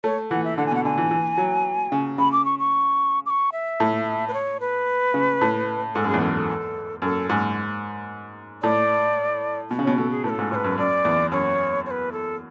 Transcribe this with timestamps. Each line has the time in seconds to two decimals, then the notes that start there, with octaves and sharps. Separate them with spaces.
0.04 A3 C#5
0.31 E3 F#5
0.45 E5
0.58 D3 F#5
0.66 G#5
0.71 B2
0.75 F#5
0.84 D3 G#5
0.98 E3
1.11 E3
1.38 F#3
1.92 C#3
2.18 C#3 B5
2.32 D6
2.45 C#6
2.59 C#6
3.26 D6
3.30 C#6
3.52 E5
3.80 A2
4.28 B4
4.34 C#5
4.60 B4
5.14 C#3
5.41 A2
5.95 G#2 A4
6.04 F#2 G#4
6.14 E2
6.21 F#2 A4
6.35 A4
7.02 F#2 A4
7.29 G#2
8.63 A2 D5
9.71 B2
9.79 C#3
9.84 B2 C#5
9.98 B2 A4
10.11 G#4
10.24 A2 B4
10.29 A4
10.39 G#2
10.51 G#2 C#5
10.55 B4
10.64 F#2
10.78 F#2 D5
11.05 E2
11.31 F#2 C#5
11.86 C#5
11.91 B4
12.12 A4